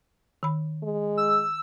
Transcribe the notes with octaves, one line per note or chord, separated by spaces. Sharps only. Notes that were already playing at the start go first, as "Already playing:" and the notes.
D#3 B5
G#3
E6